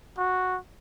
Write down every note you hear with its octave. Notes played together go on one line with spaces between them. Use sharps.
F#4